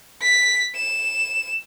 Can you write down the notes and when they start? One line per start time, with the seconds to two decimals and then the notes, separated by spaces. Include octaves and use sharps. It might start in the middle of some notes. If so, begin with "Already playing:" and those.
0.22 B6
0.76 E7